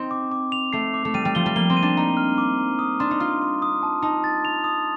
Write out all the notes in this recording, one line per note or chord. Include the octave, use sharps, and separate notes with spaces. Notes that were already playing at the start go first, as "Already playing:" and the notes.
Already playing: C4 D#4
D6
D6
F7
A3 C7
D6
A3
G3 D#7
G3
F3 G7
G3
A#3 G7
C4
D#7
D4
D#4 A#5
F6
D6
A#5
D#6
D4 C6
D#4
F4 C6
C6
D#6
A5
D#4 A5
A6
F7
D#6